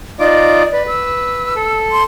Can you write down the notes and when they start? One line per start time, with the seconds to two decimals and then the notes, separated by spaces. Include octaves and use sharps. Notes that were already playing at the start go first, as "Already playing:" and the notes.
0.19 D#4 F4 D5 D6
0.73 B4
0.87 E6
1.56 A4
1.92 C6